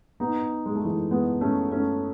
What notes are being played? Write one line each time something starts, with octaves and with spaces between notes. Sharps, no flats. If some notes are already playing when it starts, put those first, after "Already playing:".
B3 D#4
G#3
A3
E3 G#3
G#3 B3
A3 C#4
A3 C#4